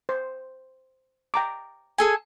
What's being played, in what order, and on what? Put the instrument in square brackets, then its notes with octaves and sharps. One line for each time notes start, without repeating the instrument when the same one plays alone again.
[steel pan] C5
G5 A#5 D6
[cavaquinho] G#4 A4 G#5